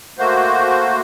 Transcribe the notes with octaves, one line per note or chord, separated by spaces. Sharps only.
A3 A#3 F#4 C5